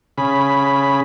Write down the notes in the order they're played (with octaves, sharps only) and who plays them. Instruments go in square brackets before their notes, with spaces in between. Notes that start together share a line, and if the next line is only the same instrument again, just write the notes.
[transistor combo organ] C#3 B5